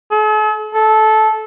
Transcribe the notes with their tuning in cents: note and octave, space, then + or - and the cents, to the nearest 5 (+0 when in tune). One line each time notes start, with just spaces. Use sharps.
A4 -45
A4 -15